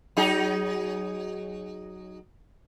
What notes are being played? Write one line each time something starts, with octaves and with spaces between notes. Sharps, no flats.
F#3 D#4 G#4